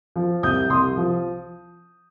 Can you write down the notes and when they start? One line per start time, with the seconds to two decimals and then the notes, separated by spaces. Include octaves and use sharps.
0.16 F3
0.43 C2 D#6 G6
0.70 C2 C6 D#6
0.97 F3